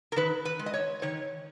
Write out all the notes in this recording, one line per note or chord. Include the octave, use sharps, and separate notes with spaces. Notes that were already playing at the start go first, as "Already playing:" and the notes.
A#4
D#3 B4
B4
G#3
D#5
C#5
D#3 C#5